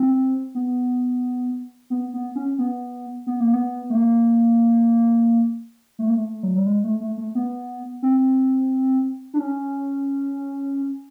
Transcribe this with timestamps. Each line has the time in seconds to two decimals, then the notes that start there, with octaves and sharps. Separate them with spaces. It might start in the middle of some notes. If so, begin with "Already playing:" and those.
Already playing: C4
0.55 B3
1.90 B3
2.14 B3
2.35 C#4
2.58 B3
3.27 B3
3.40 A#3
3.53 B3
3.90 A3
3.95 A#3
5.99 A3
6.07 A#3
6.15 A3
6.43 F#3
6.55 G3
6.66 G#3
6.84 A3
7.00 A3
7.18 A3
7.35 B3
8.03 C4
9.34 D4
9.39 C#4